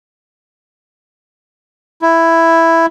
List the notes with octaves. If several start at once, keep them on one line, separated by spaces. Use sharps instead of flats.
E4